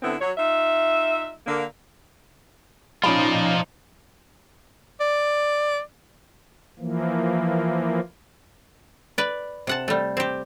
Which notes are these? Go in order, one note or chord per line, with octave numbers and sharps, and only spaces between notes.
D3 A3 B3 C4 E4
F#3 C#5
D#4 F4 E5
D3 A#3
F3 C#4 D#4 F4 D5 B5
D5
E3 F3 A#3
B4 D5
C3 F#5 A5
G3 A3
C4 G4